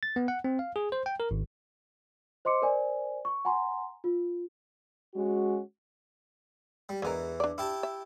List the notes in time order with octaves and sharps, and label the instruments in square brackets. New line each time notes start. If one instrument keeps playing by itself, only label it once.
[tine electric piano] A6
B3
F#5
C4
F5
G#4
C5
G5
A#4
G#1
[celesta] C5 D#5 C6 D6 C#7
A#4 C5 D5 G#5
C#6
F#5 G#5 A#5 C6
F4
[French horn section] G#3 C#4 F#4
[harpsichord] G3
[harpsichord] E2 E3 [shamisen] D3 G#3 A#4
[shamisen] D4 D5
[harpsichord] E4 G4 A5
[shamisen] E5